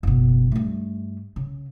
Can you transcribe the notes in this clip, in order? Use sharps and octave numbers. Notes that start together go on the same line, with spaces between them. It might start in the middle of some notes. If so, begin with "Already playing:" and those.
F#1 B2
G2 A3
C#3